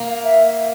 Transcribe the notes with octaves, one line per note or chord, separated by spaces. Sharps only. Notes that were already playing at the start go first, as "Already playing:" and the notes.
Already playing: A#3
F5
E5